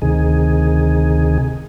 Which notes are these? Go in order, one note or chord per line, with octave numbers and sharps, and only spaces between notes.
D2 C3 D#3 G#4